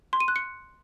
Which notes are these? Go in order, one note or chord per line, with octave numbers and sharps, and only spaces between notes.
C6
D#7
F#6
C#7